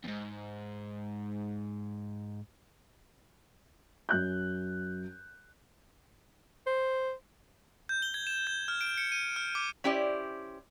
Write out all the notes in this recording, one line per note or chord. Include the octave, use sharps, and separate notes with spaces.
E2 G#2
F#2 F#6 G6
C5
G6
G7
G#6
E7
G6
F6
D7
C#7
D#7
F6
D6
C#4 E4 G4 C5 D5